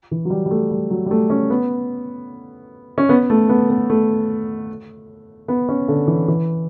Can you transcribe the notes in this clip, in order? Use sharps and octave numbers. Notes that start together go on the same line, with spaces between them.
E3
F#3
G3
G3
A3
G3
F#3
G3
A3
C#4
B3
C#4
B3
A3
B3
B3
A3
B3
C#4
D3
E3
E3